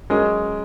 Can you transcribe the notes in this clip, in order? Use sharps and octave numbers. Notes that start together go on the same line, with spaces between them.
F#3 G#3 C#4 A#4 D#5